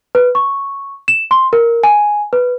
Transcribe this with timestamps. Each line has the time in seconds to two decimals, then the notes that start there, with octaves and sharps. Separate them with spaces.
0.15 B4
0.35 C#6
1.08 E7
1.31 C6
1.53 A#4
1.83 G#5
2.33 B4